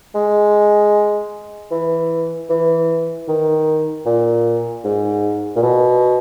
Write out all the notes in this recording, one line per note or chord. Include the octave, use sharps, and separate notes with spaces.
G#3
E3
E3
D#3
A#2
G#2
A#2
B2